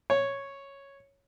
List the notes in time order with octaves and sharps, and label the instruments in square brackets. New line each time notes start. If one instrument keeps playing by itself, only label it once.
[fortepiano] C#5